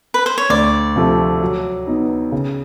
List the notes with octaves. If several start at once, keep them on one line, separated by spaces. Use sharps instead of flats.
B4
C5
C#5
D2 D5
C3 F3 A3
F#3
B3 D#4
C#3